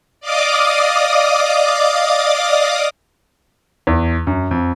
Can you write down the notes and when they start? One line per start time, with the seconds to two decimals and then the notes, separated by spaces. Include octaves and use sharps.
0.20 D5 D#5 F5 D6 D#6
3.87 E2
4.27 F#2
4.51 F2